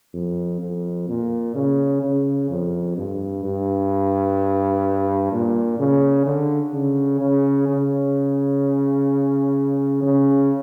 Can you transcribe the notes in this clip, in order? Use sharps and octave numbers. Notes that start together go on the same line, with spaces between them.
F2
F2
A#2
C#3
C#3
F2
G2
G2
A#2
C#3
D3
C#3
C#3
C#3
C#3